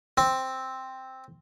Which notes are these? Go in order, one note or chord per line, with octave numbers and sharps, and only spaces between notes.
C4